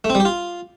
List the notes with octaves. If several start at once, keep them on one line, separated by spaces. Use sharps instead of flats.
A3
C4
G3
G4
F4